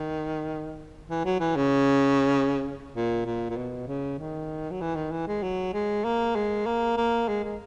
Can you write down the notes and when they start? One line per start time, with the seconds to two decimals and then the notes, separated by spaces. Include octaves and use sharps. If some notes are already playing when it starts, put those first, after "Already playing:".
Already playing: D#3
1.09 E3
1.25 F#3
1.40 E3
1.56 C#3
2.95 A#2
3.25 A#2
3.50 A#2
3.57 B2
3.88 C#3
4.19 D#3
4.71 F#3
4.81 E3
4.96 D#3
5.11 E3
5.27 G#3
5.43 F#3
5.73 G#3
6.04 A#3
6.35 G#3
6.66 A#3
6.97 A#3
7.28 G#3
7.44 G#3